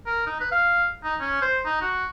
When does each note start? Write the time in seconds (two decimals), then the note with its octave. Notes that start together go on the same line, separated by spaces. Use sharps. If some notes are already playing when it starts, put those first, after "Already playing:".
0.06 A#4
0.26 D#4
0.40 B4
0.52 F5
1.04 D#4
1.20 C#4
1.42 C5
1.65 D#4
1.82 F#4